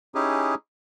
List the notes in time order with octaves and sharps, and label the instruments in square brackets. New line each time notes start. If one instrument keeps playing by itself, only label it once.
[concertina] C#4 D#4 E4 G4 G#4